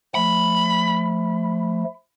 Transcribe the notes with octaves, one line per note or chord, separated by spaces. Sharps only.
F3 A3 B5